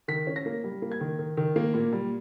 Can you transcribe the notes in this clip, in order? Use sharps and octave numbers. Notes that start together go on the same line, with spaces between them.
D#3 B6
C#4
A#6
A#3
G3
A#3
G#6
D#3
D#3
D#3
A#3
A#2
G3